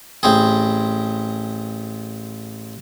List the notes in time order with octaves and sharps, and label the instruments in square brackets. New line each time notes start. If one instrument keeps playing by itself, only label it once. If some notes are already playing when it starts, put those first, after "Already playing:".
[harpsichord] A1 C4 G#4